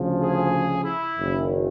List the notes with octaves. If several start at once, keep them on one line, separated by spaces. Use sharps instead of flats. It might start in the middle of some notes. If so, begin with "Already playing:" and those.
Already playing: D2 C#3 F3
G#4
E4
F#1 F#2 D#3